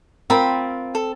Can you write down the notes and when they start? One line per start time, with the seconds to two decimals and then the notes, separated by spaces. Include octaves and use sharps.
0.30 C4 F4 A#4 B5
0.95 A4